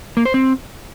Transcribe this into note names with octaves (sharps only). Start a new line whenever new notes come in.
A#3
C5
C4